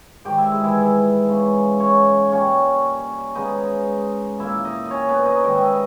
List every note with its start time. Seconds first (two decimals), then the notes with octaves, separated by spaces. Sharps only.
0.25 G#2 D#3 G3 G4 G5
0.38 E4 E5
0.51 G#3 G#4
0.64 E3 E4
1.29 C#3 G#3 B3
1.80 C#4 C#5
2.32 A#2 G3 A#3 C#4 C#5
3.35 C#3 G#3 B3 D#4 D#5
4.39 A#2 A#3 E4 E5
4.65 D#4 D#5
4.86 C#4 C#5 D#5
5.08 B3 B4
5.25 D#4 D#5
5.43 G#2 D#3 G3 B3 G5
5.54 E5
5.65 D#5